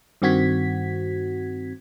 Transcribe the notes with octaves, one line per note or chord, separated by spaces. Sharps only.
G2 D#3 C4 F#4 G#6 B6